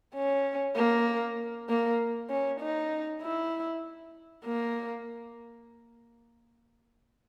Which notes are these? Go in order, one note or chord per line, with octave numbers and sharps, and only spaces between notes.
C#4
A#3
A#3
C#4
D#4
E4
A#3